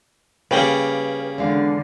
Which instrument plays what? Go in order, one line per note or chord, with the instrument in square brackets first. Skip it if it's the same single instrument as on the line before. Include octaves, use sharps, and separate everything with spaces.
[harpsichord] C#3 G3 A#3 [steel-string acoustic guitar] B4 G5
[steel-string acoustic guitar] E2 G#3 F5 [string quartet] D3